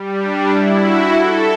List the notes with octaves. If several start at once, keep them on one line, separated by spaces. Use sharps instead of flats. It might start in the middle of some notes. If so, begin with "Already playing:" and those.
Already playing: G3
D4
E4
F#4
A4